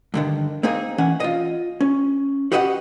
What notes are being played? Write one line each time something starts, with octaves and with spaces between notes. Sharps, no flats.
G2 D3 D#3
A#3 C4 D#4 G#4
E3 C#4 F#5 G#5
F4 D#5
C#4
F#4 G4 B4 D#5 E5 F#5